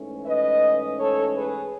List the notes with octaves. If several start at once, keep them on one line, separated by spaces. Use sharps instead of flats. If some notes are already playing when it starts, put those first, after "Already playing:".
Already playing: G#2 E3 A3 C#4
B4 D#5
A4 C#5
G#4 B4